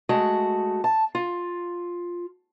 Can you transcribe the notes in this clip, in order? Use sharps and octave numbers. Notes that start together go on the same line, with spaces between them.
G#3 A3 F#4
A5
F4